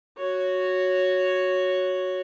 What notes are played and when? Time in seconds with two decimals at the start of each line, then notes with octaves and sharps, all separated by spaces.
0.17 F#4 C#5